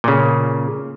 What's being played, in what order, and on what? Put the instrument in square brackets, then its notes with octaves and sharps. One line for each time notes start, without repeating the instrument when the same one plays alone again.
[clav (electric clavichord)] A#2 C#3